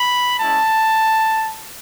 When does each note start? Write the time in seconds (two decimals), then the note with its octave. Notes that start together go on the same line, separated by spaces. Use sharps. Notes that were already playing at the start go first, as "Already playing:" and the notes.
Already playing: B5
0.40 G#3 C#4 E4 A5